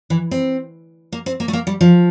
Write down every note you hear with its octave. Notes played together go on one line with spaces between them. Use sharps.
E3
C4
A#3
C4
A#3
A3
A#3
G3
F3